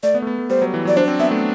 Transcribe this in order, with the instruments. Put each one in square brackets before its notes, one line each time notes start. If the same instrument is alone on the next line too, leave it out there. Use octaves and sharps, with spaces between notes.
[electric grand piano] A3 [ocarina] D5
[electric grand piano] B3
A3
B3
A3
[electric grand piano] G3 [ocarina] C5
[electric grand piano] F#3
E3
[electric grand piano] F#3 [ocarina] D5
[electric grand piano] D4 [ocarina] C5
[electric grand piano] C4
[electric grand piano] B3 [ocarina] E5
[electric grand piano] A3